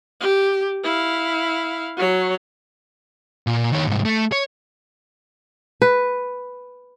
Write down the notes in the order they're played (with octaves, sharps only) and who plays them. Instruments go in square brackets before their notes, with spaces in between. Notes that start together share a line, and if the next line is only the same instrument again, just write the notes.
[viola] G4
E4 F5
F#3 C#5
[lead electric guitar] A#2
D#3 C#5
C2 G#2
A3
C#5
[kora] B4